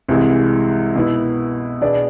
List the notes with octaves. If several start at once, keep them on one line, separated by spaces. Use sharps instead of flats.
C2 C3 E3 G#3
B2 B3 E4
B2 B3 D4 G#4 D5